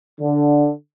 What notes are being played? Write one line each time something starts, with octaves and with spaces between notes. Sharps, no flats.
D3